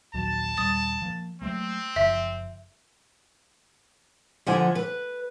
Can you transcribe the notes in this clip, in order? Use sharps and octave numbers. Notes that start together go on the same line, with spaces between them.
A#1 D#2 F#3 A5
D#1 G3 D#6 A6
F3 A#3
F#3 A3 A#3 C4
F#1 F3 E5
D3 F3 F#5 G#5
B4